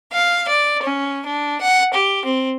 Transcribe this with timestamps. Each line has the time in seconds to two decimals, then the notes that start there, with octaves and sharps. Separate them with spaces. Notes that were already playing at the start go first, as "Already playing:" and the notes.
0.11 F5
0.47 D5
0.82 C#4
1.25 D4
1.61 F#5
1.93 G4
2.25 C4